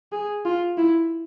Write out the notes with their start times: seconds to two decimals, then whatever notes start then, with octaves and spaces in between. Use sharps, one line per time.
0.12 G#4
0.45 F4
0.78 E4